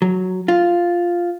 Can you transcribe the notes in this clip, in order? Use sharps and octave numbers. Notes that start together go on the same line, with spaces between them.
F#3
F4